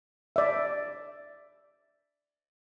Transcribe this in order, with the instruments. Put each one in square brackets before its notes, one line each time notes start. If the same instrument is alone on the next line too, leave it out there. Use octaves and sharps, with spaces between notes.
[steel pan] D5 E5